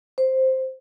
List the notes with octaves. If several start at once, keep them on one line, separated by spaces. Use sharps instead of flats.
C5